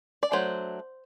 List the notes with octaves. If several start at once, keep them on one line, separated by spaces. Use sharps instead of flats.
D5
F#3 A3 D4 C5